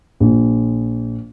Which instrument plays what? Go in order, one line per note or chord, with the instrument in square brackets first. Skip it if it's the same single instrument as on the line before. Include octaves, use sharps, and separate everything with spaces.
[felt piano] A#1